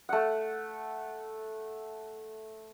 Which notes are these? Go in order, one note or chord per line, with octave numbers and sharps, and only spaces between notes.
A3 F#5